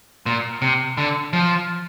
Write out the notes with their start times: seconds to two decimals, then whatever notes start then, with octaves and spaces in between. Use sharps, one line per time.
0.26 A#2
0.62 C3
0.98 D3
1.33 F3